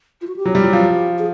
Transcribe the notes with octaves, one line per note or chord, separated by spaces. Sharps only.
F4
F#4
G4
F#3
G3
F#3
F3
G#4